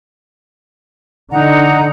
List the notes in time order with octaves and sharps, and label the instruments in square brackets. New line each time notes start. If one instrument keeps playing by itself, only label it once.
[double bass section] D3 [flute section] D#4 F#5 A#5